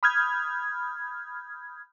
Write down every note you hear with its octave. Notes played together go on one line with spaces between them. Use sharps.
B5 D#6 F6 G6 G#6